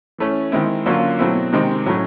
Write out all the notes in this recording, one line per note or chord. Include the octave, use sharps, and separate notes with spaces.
E3 A3 C#4
D#3 G#3 C4 E4
D3 F#3 A#3 C#4 F4
B2 F#3 A3 C4 E4
C3 D#3 G#3 C4 D#4
A2 F#3 A3 C#4